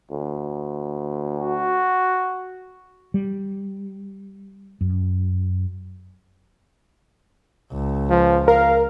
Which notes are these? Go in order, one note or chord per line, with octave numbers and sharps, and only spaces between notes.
D2
F#4
G3
F#2
C#2
F3
A#4 F5